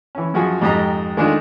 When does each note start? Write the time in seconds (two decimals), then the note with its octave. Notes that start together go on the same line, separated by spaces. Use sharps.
0.15 E3 C#4
0.34 F#2 F3 F#4 G#4
0.61 F2 G#2 G4 D#5 A#5
1.17 D#3 G#3 A3 D4 D#4 F4